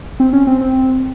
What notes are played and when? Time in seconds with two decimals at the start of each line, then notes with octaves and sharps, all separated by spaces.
0.20 C4
0.33 C#4
0.47 C4
0.61 C4